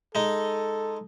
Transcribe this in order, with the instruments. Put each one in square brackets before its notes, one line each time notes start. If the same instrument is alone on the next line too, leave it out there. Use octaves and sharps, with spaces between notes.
[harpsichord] G#3 D#4 [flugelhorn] A4